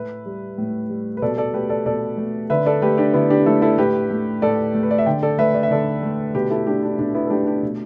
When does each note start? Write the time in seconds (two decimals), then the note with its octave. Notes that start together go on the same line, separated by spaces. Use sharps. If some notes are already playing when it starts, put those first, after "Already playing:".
Already playing: A2 A3 B4 E5
0.26 G3
0.58 A2
0.90 G3
1.17 B4
1.22 B2 A4 D5
1.38 A4 D5
1.54 A3 G4 B4
1.69 A4 D5
1.86 B2 A4 D5
2.17 A3
2.50 D3 B4 E5
2.66 A4 D5
2.82 A3 G4 B4
2.98 D4 G4
3.14 D3 B3 E4
3.30 D4 G4
3.46 A3 E4 A4
3.62 E4 A4
3.78 A2 G4 B4
4.10 A3
4.42 A2 A4 D5
4.74 A3
4.83 B4
4.91 D5
4.98 E5
5.06 D3 D5 G5
5.23 A4 D5
5.38 A3 B4 E5
5.54 D5
5.63 E5
5.71 D3 A4 D5
6.02 A3
6.34 B2 G4 B4
6.50 E4 A4
6.67 A3 D4 G4
6.83 D4
6.98 B2 D4
7.14 B3 E4
7.27 A4
7.30 A3 D4 G4
7.46 D4 G4
7.63 B2